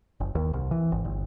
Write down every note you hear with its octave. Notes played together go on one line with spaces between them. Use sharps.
F#1
D#2
C2
E3
G#1
G1